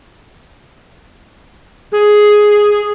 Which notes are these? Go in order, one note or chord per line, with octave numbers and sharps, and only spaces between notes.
G#4